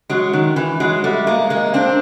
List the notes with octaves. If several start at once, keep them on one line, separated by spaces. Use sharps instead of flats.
F#3 G#3
D#3
E3
F#3 G#3
G3 A3
G#3 A#3
G#3 A#3
C4 D4